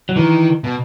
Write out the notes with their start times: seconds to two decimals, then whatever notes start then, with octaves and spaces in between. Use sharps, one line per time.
0.09 F#3
0.16 D#3 E3
0.64 B2